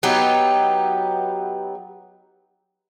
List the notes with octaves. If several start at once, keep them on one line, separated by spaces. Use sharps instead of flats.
F#3 B3 D#4 G4